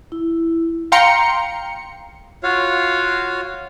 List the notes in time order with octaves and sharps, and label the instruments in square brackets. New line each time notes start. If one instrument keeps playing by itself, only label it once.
[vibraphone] E4
[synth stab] F5 G5 A#5 C6 C#7
[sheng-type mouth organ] F4 F#4 C#5 F5